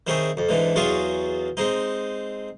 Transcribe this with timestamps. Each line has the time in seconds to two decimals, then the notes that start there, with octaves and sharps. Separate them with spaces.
0.07 D#3 C4 E4 G#4 C#5
0.37 F2
0.49 G#2 D3 E3
0.76 E2 F#3 F4 G#4 C#6
1.57 G#3 C4 D#4